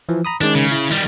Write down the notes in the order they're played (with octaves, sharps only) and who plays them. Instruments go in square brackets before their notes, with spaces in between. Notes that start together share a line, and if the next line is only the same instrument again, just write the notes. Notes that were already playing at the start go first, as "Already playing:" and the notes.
[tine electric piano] E3 F3
A#5 B5 D#6
[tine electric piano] D#3 G#3 C#4 [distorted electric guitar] D4
[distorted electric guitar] C#3
[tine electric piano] E4
[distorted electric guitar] D#3 G3